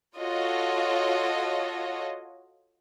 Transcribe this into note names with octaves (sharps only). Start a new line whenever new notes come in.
F4 F#4 A4 C#5 D#5